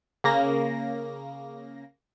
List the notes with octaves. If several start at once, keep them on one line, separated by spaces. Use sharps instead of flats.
C#3 A#3 A#6